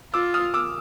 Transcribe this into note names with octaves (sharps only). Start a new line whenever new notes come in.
F4 D6 E6
D#6 F6
D6 E6